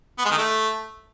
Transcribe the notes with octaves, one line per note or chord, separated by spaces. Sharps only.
B3
G#3
D#3
A3